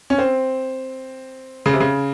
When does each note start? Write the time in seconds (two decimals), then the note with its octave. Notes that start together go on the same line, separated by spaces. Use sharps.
0.10 C#4
0.18 C4
1.66 C#3
1.73 C3
1.80 C#3